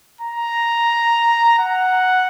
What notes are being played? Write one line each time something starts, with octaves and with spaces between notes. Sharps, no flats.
A#5
F#5